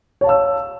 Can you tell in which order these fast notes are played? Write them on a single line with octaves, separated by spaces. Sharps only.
C#5 A5 F5 E6